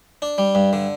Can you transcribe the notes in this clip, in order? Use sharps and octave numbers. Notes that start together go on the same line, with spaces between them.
D4
G3
G2
D3